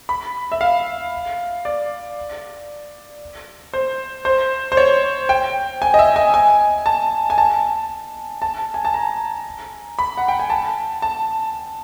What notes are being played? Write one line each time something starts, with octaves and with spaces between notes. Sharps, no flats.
B5
E5
F5
D5
C5
C5
C5
C#5
G5
G#5
D#5
E5
G#5
G#5
A5
G#5
A5
A5
G#5
A5
A#5
B5
F#5
G5
G#5
A5
A5